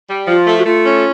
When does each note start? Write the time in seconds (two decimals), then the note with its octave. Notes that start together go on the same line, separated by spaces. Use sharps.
0.09 G3
0.28 F3 F4
0.47 A3
0.59 F#4
0.65 A3 F4
0.85 C#4